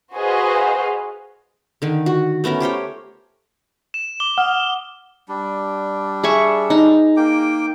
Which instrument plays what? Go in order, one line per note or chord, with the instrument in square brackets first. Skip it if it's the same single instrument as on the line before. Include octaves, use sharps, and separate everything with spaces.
[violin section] F#4 G#4 B4 C5 D#5 F5
[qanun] D3 D#3
F#4
A3 B3 C#4 A#4
G4 C5 C#5 G5
[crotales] E7
D6 G7
[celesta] F#5 [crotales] D#6 F6
[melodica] G3 D4
[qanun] G#4 E5 C#6
D#4
[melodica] A#3 G5 D6